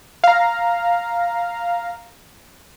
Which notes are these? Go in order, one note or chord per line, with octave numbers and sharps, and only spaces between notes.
F5 A#5